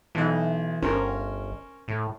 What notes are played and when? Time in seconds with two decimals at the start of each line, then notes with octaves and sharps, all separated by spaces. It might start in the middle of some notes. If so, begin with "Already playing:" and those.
0.15 B1 E3 D#4
0.82 G1 C#4 A#4 C5
1.88 A2